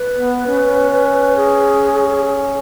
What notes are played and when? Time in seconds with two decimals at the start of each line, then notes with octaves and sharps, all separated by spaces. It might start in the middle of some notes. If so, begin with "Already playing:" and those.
Already playing: B4
0.18 B3
0.47 C#4
1.36 G#4